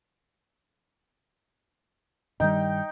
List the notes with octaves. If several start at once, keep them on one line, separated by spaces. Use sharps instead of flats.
G2 D#3 G3 D#4 G5